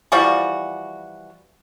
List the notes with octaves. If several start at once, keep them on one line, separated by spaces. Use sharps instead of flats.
E3 F3 G3 F#4